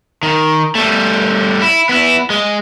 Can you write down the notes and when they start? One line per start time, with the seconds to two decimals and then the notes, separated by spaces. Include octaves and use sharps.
0.23 D#3
0.75 G3 A3
1.62 E4
1.89 B3 E4
2.30 G#3